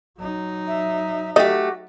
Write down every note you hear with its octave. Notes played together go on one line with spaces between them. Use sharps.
F#3 D#4
E5
A3 F#4 G4 D#5